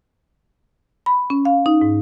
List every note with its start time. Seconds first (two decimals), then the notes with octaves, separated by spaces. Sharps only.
1.06 B5
1.30 C#4
1.45 F5
1.66 D#4
1.82 G#2